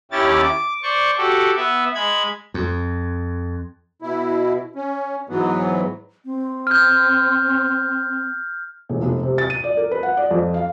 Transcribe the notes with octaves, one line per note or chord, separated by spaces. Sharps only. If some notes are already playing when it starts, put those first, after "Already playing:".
D#2 C#4 E4 G4 A6
D6
C5 D5 C#6
F#4 G4 A4
B3 E5
G#3 B5 G#6
F2
B2 E4
C#4
G#2 E3 F#3 B3
C4
F6 G6
E1
F1
C3
A6
D#7
D5
A#4
B4
F#5
D5
F2
F5